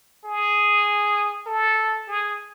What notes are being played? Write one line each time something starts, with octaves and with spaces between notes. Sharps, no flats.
G#4
A4
G#4